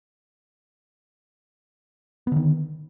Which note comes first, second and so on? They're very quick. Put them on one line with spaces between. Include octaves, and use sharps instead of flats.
B3 D3 D#3